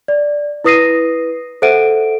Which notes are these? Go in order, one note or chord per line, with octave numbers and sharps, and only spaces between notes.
D5
E4 B4 D#6 A#6 C7 D#7
A4 C5 E5 F#5 D7 D#7